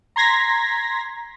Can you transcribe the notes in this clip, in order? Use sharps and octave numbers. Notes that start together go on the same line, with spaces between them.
A#5 C6 G#6 A#6 B6